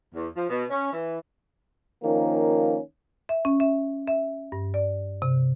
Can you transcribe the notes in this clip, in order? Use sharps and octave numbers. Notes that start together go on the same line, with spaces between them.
E2
F3
B2
C#4
E3
D#3 F3 A#3 C#4
E5
C#4
E5
E5
G2
D5
C3